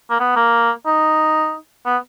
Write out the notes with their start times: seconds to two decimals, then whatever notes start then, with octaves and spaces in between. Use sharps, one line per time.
0.10 A#3
0.20 B3
0.36 A#3
0.86 D#4
1.86 B3